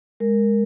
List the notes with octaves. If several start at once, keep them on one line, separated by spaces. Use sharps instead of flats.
G#3 A#4